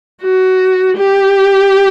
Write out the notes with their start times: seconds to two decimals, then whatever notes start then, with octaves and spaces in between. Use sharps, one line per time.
0.23 F#4
0.97 G4